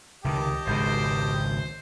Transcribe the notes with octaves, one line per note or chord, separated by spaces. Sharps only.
C#2 C3 D#3 G4 D#5 A5
G#1 C#2 B2 C5